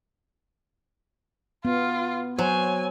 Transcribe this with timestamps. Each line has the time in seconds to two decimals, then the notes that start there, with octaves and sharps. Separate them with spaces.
1.65 B3 F4
2.39 F#3 C5 G#5